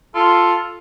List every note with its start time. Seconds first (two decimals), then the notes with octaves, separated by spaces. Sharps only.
0.15 F4 A4